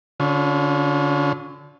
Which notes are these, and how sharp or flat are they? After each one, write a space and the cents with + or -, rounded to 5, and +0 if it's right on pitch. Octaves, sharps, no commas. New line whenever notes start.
D3 -25 C#4 +0 F4 +40